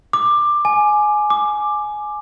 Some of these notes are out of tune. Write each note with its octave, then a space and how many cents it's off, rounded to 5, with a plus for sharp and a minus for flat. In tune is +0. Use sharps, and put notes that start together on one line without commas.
D6 +15
G#5 +15
D6 +10